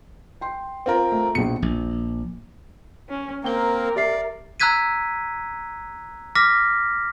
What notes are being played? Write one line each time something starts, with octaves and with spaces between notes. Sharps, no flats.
G5 C6
C4 F4 A#4
A3
A#1 B2 C#7
A#1
C#4
A#3 C4 A#4 G5 G7
G4 D5 E5 C7
A#5 E6 F#6 G#6 B6 D#7
D6 F6 A#6 B6